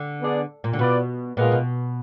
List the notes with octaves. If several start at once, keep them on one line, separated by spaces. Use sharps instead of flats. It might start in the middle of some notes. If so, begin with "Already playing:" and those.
Already playing: D3
B3 D4 G#4 D5
A#2
D3
B2 B3 F4 B4 D5
A#2 G#3 B3 F4 A#4 D#5
B2